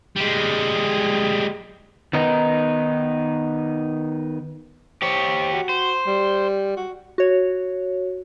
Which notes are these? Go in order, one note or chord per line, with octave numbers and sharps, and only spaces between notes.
G3 G#3
D#3 B3 D#4
G4 C5 C#5
F#4
C5
G3
F#4
F#4 C#5